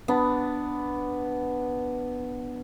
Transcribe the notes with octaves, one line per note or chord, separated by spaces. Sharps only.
B3 D4